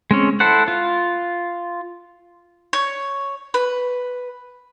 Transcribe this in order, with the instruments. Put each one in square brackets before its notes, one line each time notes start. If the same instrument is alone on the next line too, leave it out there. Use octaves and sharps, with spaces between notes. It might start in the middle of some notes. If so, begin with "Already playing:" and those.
[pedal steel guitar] G#3 C4 C#4
E4 A4 C5 F#5
F4
[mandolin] C#5
B4